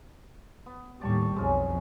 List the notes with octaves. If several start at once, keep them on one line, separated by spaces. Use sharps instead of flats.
B3
D#2 A2 G3 D5 A5 C#6
B1 F2 G#3 C#4 G#4